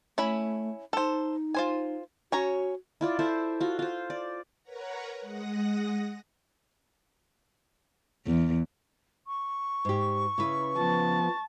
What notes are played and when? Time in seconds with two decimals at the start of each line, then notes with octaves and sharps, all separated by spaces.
0.18 A3 C#4 E4 B5
0.93 D#4 A4 C5
1.54 F4 C5 G#5
2.32 C#4 F#4 C#5 A#5
3.01 E4 F4 D5
3.19 E4 A4 C5 D5
3.60 F4 F#4
3.79 F4 C5
4.10 D5
4.63 A#4 B4 C#5 F#5 A#5
5.21 G#3 F#5 D#6 A#6
8.27 E2
9.27 C#6
9.85 G#2 G4
10.38 C#3 C#4 E4 B4
10.77 F3 B3 A5